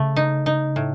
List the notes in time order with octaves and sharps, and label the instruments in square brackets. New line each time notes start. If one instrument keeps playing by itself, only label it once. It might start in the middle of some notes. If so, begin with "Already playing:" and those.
Already playing: [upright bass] C#3 [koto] A3
[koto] D#4
D#4
A2